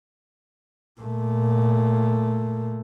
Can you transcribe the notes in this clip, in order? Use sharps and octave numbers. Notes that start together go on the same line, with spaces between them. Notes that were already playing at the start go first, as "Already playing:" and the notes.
A#2 A3